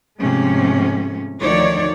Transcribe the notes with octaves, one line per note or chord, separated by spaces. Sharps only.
G#2 C3 F3 A3 C#4
D2 D#3 F3 D#4 C#5 D5